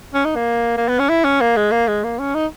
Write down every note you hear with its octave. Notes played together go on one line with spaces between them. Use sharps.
C#4
D#4
A#3
A#3
B3
C#4
E4
C#4
A#3
G#3
A#3
G#3
A#3
C#4
D#4